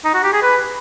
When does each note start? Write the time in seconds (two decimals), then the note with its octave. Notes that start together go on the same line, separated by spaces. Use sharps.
0.04 D#4
0.14 F#4
0.23 G4
0.33 G#4
0.42 B4